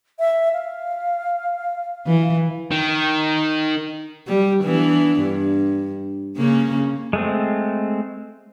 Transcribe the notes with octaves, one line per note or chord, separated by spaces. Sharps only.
E5
F5
E3
D#3
G3
E3 B3 D4
G2
C#3 A#3 C#4
G#3 A3 C4